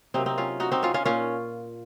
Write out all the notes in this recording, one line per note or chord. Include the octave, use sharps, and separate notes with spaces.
C3 F#3 A#3 C4 D#4
C4 D#4
C#4 F4
D#4 F#4
C4 D#4
C#4 F4
C#4 F4
A#2 C#4 F4